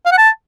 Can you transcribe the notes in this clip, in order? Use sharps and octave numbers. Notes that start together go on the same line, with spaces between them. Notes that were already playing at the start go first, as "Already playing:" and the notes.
F5
F#5
A5